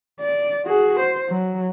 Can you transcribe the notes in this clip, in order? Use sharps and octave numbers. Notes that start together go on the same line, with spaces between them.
D5
F#4 G#4
C5
F#3